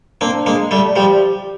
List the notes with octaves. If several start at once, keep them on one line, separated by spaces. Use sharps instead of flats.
A#3 C4 D4
G#3 A#3
G3 A3
F3 G3 G4